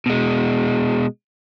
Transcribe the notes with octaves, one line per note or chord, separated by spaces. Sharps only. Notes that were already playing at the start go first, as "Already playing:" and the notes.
B2 G#3